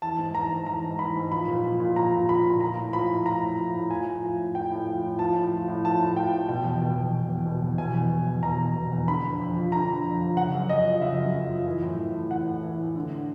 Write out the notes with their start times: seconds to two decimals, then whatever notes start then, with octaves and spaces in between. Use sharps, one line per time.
0.02 E3 A5
0.18 G#2
0.34 E3 A#5
0.51 G#2
0.66 E3 A#5
0.83 G#2
0.99 E3 B5
1.16 G#2
1.32 F3 B5
1.48 A#2
1.64 F3
1.80 A#2
1.96 F3 A#5
2.12 A#2
2.29 F3 B5
2.45 A#2
2.61 F3 A#5
2.77 A2
2.93 F3 B5
3.10 A2
3.26 F3 A#5
3.42 A2
3.58 F3
3.74 A2
3.90 F3 G#5
4.07 A2
4.22 F3
4.39 A2
4.55 F3 G5
4.71 A2
4.87 F3
5.03 A2
5.19 F3 A5
5.35 A2
5.53 F3
5.68 A2
5.84 F3 A5
6.00 A2
6.16 F3 G5
6.33 A2
6.49 B2 G5
6.65 E2
6.82 B2
6.98 E2
7.13 B2
7.30 E2
7.46 B2
7.62 E2
7.78 B2 G#5
7.95 E2
8.10 B2
8.27 E2
8.43 B2 A#5
8.59 E2
8.76 B2
8.92 E2
9.08 D3 B5
9.24 F2
9.40 F2
9.57 F3
9.72 D3 A#5
9.89 F2
10.04 F2
10.21 F3
10.37 C#3 F#5
10.53 F#2
10.69 F#2 D#5
10.85 F3
11.01 C#3 E5
11.18 F#2
11.34 F#2
11.50 F3
11.66 E3
11.82 A2
11.98 E3
12.15 A2
12.31 E3 F#5
12.47 A2
12.63 E3
12.79 A2
12.96 D3